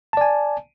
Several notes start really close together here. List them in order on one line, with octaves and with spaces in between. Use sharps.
A5 D5 G#5